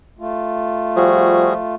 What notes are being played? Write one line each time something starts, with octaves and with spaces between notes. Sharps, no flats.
A3 F4
F3 G3 F#4 G#4